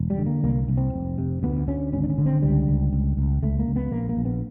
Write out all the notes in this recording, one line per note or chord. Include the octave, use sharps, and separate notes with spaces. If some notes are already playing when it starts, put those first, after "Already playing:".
Already playing: E1
G3
D3
A#3
C2 A#3
C2
C4
F1
C3
D2 B3
D2 C#4
G#1 C#4
D4
C#4
D3
C4
C#2 G3
C#2
C#2
C#2
C#2 A3
A#3
C#2
B3
A#1 A#3
A#3
A#1
B3